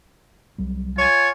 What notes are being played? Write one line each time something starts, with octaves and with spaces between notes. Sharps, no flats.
C2 F#3 G3
F4 C#5 G#5